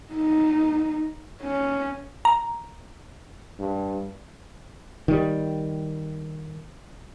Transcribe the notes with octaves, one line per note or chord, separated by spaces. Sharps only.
D#4
C#4
A#5
G2
D#3 G3